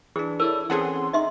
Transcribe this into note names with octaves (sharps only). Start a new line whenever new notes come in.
E3 D4 G#4
E4 A4 A#4 C#5 D5
E3 C4 C#4 G#4 A4 F#5 C6
D#4 D#5 E5 C6